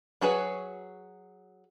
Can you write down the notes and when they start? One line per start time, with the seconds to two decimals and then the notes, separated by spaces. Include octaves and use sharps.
0.21 F#3 F#4 G#4 B4 C#5